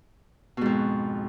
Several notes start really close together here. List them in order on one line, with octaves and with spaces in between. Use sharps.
B2 G#2 F2